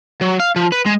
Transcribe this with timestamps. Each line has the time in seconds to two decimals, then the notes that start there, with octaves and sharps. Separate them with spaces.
0.21 F#3
0.40 F5
0.56 F3
0.72 B4
0.86 G#3